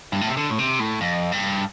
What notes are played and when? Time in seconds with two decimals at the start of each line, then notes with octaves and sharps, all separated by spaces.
0.12 G2
0.21 A2
0.29 C3
0.37 D3
0.50 A2
0.59 C3
0.80 A2
1.01 F2
1.32 G2